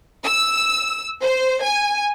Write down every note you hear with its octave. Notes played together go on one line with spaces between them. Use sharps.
E6
C5
G#5